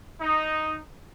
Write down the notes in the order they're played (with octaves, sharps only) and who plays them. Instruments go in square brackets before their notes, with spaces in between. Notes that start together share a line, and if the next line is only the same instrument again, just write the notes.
[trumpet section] D#4